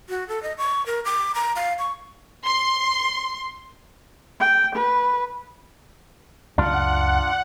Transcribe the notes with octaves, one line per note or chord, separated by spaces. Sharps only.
F#4
A4
D#5
C#6
A#4
D6
A#5
F5
C#6
C6
G5
B4
C#2 F#2 D4 F4 F#5